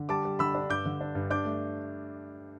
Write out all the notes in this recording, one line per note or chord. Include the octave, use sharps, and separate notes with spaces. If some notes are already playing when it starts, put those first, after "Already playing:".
Already playing: D3
G3 A5 D6
G3
D3 B5 E6
D4
G2 D6 G6
D3
D4
G2
D4 D6 G6
A3